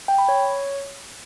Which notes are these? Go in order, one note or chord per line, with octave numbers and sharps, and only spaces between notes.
G5
B5
C#5